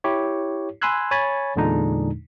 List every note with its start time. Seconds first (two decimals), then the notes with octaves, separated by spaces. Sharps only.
0.04 E4 G4 C#5
0.82 G#5 B5 C6 E6 F#6 G#6
1.11 C#5 G#5 B5 A6
1.56 E2 A#2 D3 G#3 D4 D#4